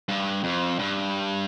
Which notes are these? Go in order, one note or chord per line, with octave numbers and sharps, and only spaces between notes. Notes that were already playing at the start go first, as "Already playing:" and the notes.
G2
F2
G2